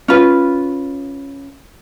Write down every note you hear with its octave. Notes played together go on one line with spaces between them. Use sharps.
C#4 F4 B4